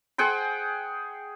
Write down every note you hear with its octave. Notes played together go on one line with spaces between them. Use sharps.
G#4 F#5 G5 C6